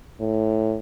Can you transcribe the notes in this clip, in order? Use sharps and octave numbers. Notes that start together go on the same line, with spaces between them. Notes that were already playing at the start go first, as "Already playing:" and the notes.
A2